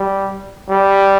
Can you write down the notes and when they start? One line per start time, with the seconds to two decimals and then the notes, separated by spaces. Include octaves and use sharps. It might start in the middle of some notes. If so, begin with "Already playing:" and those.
Already playing: G3
0.70 G3